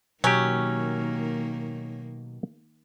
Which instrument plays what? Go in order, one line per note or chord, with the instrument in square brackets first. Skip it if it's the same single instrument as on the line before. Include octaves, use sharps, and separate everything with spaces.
[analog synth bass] B2 [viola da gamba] D#3 A#3 [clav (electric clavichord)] F#3 G4 [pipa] C#4